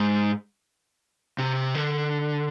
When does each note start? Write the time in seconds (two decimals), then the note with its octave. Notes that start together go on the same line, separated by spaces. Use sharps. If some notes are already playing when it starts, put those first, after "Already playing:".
Already playing: G#2
1.38 C3
1.75 D3